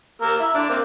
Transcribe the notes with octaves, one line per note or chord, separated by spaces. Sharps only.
A#3 A#4 E6
E4
D3 D4 D6
A#3 C4